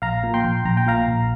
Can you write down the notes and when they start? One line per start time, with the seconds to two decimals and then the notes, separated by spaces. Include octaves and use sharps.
0.02 A#1 F5 A#5
0.23 A#2
0.34 G5 C6
0.44 A#1
0.65 A#1 A#5
0.77 G5
0.86 A#2 F5 A#5
1.08 A#1